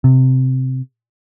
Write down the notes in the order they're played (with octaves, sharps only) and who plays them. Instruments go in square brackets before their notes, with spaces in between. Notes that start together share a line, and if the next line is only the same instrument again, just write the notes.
[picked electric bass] C3